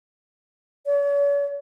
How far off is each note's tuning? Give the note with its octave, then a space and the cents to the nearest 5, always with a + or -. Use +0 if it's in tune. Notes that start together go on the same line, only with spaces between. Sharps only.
C#5 +45